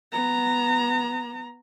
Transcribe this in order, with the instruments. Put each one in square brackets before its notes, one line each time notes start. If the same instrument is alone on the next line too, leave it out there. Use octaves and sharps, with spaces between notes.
[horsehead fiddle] B3 A#5